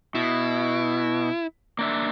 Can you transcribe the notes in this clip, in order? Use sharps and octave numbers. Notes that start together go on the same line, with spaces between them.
B2 E4
A#3 D4 E5